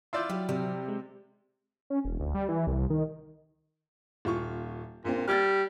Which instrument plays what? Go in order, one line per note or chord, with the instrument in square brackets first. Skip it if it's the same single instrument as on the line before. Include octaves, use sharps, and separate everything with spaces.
[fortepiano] E4 F4 D5 [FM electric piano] C6 E6 G6
[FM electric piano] F#3 F#4 [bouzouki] G3
[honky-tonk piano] C3 [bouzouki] G3
[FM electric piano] G#3
[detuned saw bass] C#4
E1
D2
G3
E3
C2
D#3
[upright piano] D#1 F4 C#6
[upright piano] A#1 C4 [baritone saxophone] A#2
[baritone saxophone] G3 [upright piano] F6 G#6 A6